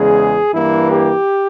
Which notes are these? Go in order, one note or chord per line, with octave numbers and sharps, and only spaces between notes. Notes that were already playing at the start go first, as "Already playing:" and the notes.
Already playing: E2 C#3 G#3 G#4
G2 E3 A#3 E4
G4